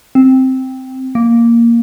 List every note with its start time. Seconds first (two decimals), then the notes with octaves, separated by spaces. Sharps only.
0.15 C4
1.15 A#3